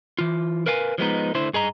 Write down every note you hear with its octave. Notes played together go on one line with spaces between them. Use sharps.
E3 F4
A#4 B4 F5 G#5
F3 G#3 B3 D#4
D3 A3 E4 C5
G2 G#4 D#5 A#5